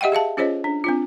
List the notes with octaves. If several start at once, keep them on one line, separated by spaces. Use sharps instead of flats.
G4 D#5 E5 F#5 G5
G#4 E5 F5 A5
C#4 F4 G#4 C5 C#5 D#5
D4
C4 D4 F4